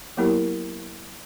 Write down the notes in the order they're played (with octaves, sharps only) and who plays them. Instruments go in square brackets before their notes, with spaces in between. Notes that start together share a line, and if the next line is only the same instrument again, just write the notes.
[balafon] F#3 A#3 B3 E4 G4 A#4